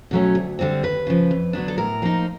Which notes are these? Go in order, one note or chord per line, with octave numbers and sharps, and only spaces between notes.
B2 F#3 A3 C#4
D2
D3 G3 C4
D#2 B4
C#3 F3
F2
D3 F#3 B3 D4
A4
A2 A#4
F3 A#3 D#4